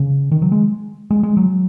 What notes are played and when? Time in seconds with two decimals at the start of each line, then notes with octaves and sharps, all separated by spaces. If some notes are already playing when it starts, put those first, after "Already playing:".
Already playing: C#3
0.31 D#3
0.42 F#3
0.52 G#3
1.11 G#3
1.23 G#3
1.37 F#3